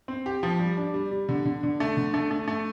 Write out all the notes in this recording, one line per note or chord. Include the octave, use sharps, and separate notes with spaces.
C4
G4
F3
G3
D4
G3
G3
D3
D3
D3
A3
D3
A3
A3
A3